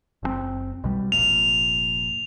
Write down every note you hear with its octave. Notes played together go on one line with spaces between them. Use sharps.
F#1 C3 C4
B1 B2 G3
F1 F2 A#2 F7